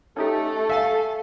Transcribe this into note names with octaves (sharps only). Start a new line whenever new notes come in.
A3 C#4 D#4 G4 A4
E5 F5 G#5 A6